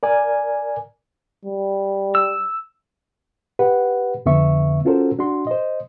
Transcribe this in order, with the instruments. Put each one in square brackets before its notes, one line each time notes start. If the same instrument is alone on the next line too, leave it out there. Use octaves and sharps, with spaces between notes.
[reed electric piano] A#4 D5 G#5
[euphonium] G3
[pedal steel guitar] E6
[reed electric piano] G4 B4 F#5
F2 D3 B3 E5 C#6
C#4 F4 F#4 A4 A#4 C5
D4 F#4 C6
C5 D#5